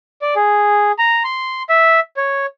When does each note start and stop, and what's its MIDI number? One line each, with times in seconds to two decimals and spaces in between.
0.22 0.34 74
0.35 0.92 68
0.99 1.23 82
1.24 1.63 84
1.69 2.00 76
2.17 2.46 73